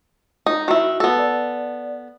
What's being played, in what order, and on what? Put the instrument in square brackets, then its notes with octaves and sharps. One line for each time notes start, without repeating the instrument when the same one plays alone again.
[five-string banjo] D#4
[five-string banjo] D#3 E4 [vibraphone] F#4
[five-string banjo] B3 A4
[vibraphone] D5